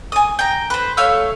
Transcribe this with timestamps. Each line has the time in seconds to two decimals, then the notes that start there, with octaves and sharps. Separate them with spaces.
0.12 G#5 D#6
0.39 G5 A#5
0.70 B4 C5
0.97 A3 C#5 F5 E6